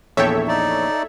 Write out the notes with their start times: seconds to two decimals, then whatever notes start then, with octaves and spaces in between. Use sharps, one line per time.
0.17 A#1 E2 A4 C#5 E5 G5
0.48 D#4 D5